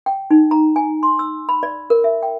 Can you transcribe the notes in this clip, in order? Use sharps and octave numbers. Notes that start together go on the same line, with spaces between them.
G5
D#4
A#5
G#5
C6
E6
B5
D5
A#4
E5
G5